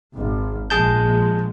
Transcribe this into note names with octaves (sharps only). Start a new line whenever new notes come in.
G#1
A#1 G#3 G#4 A5 G6